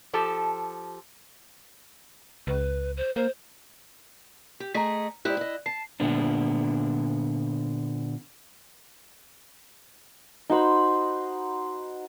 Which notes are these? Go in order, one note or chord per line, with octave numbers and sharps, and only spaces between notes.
F3 G4 A4 A5
C#2 B4
C5
A#3 C5
G4
A3 G#4 D#5 A#5 B6
G#2 E4 G4 D5 F#6
E4 D#5
A5 C7
A#2 D3 B3 D4
D#4 F#4 C5 B5